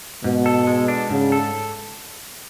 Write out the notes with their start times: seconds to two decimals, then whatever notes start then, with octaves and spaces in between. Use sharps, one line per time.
0.24 G#2 B2
0.46 A4
0.67 G#3
0.88 D4
1.10 G#2 C#3
1.32 A4